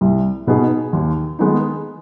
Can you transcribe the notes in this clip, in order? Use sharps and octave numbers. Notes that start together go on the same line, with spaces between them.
C2
B2 B3 D#4 G#4
D#2
D#3 G#3 B3 D#4